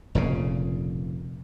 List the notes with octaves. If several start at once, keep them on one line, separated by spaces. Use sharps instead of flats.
F1 A#2 C#3